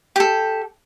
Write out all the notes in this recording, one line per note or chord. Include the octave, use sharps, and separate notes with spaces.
G4 A4